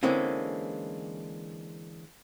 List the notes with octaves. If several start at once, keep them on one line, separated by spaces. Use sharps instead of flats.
D3 E3 G#3 A#3 C4 C#4